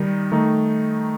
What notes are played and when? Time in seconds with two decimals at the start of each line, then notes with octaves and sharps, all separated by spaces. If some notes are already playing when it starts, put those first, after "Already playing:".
Already playing: D#3 G3 D#4
0.32 D#3 A3 D#4